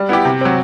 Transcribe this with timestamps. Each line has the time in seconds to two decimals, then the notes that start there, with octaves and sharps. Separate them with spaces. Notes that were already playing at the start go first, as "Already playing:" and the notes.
Already playing: G3
0.09 B3 E4 G4
0.25 C3
0.41 F#3 C4